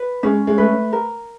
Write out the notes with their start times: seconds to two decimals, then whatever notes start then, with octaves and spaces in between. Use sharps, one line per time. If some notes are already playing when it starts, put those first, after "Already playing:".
Already playing: B4
0.23 G#3 C#4
0.47 G#3
0.58 A3 B4
0.93 A#4